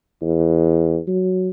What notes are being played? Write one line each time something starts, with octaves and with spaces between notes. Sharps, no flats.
E2
F#3